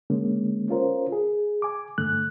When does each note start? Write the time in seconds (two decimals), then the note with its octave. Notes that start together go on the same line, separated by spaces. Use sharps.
0.10 D3 G#3 A#3 C#4
0.69 C#4 F4 A#4 C5
1.12 G#4
1.62 G#5 D6
1.98 G2 D3 A3 F#6